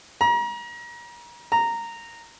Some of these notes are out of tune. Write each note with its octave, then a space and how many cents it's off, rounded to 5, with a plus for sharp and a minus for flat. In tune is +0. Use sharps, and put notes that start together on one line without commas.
A#5 +35
A#5 -10